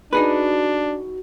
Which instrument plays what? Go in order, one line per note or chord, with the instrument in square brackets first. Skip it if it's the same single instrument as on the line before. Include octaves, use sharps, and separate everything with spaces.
[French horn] D4 [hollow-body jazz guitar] D#4 G#4 B4 [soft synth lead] F#4